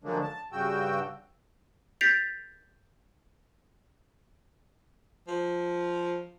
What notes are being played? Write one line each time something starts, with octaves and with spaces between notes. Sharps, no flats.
D3 F3 F#3 G#3 A#3 D4
A5
G2 C#3 F#4 G5 E6
G6 A6 B6 C7 D7 F7
F3